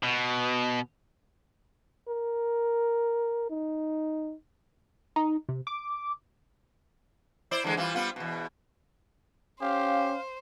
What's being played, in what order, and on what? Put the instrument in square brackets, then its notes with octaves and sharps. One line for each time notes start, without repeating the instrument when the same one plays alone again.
[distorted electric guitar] B2
[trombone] A#4
D#4
[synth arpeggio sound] D#4
C3
D6
[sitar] E4 C5 D5
D3 E3 G#3
E3 G3 F4
G3 B3 F4
E2 B2
[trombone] C#4 [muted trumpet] G4 [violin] C5 [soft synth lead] F5